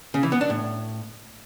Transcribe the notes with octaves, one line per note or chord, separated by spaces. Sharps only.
C#3
E3
B3
D4
A2